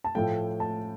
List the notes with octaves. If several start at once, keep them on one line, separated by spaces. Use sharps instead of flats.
A5
A2 F3 A3 G5
A5